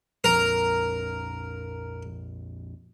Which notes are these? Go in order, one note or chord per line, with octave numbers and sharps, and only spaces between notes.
A#1 F2 A#4